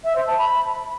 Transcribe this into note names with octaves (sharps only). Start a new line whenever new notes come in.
E5
C5
A5
B5